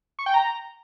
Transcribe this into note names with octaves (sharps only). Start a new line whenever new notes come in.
C#6
G5
A#5